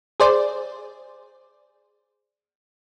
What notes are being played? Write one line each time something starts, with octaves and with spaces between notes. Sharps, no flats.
G#4 C5 D5